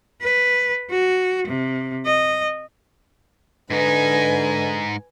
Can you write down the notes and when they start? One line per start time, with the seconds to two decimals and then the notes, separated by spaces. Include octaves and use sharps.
0.22 B4
0.90 F#4
1.47 C3
2.06 D#5
3.70 G#2 D3 D#4 B4 G#5